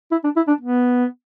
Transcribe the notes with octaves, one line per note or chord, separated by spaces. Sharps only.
E4
D4
E4
D4
B3